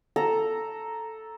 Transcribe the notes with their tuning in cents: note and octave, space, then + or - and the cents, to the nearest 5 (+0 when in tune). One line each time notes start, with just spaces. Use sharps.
A4 +0 A#5 +0